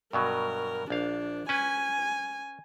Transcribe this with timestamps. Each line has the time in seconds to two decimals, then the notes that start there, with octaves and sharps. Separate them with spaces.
0.13 G2 B2 F#3 A#4
0.90 A#1 D4 F5
1.49 C#4 B4 G#5